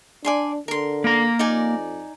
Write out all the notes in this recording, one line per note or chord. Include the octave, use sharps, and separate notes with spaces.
D4 D5 G#5 C6
D3 A#4 C6
A#3 A#5
F2 D#4 D5 G#5